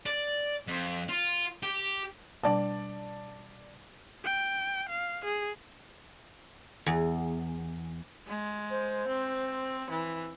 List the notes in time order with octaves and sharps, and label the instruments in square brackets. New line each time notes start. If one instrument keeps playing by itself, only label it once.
[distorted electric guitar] D5
F2
F4
G4
[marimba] B2 G3 D4 [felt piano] D5 A5
[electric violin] G5
F5
G#4
[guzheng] E2
[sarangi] G#3
[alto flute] C5
[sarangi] C4
E3